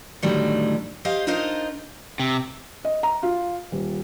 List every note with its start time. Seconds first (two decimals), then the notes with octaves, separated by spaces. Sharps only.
0.22 A2 D3 D#3 F#3 G3 A3
1.05 G4 C5 D#5 F5
1.27 D4 D#4 F4 A#4 C5 D#5
2.20 C3
2.85 D#5
3.03 A#5
3.23 F4
3.72 D#1